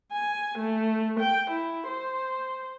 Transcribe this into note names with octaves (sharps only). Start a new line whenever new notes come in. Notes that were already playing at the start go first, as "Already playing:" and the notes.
G#5
A3
G5
E4
C5